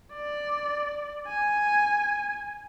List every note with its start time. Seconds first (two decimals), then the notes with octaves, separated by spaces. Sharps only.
0.13 D5
1.28 G#5